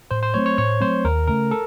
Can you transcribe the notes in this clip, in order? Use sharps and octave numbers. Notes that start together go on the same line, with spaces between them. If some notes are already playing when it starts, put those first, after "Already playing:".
A2 C5
C5
F#3 A3 C4 C#5
C#5
A2 C#5
F#3 A3 C4 C5
D#2 A#4
C#3 A3 A#4
A4